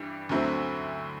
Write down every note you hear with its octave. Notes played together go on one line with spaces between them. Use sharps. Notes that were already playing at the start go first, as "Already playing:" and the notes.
Already playing: G2 E3 G3
D2 D3 F#3 C4 E4